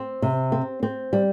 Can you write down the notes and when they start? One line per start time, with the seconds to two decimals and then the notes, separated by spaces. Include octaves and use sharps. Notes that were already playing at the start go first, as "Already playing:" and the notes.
Already playing: C4
0.22 C3
0.52 C4
0.83 C4
1.13 G3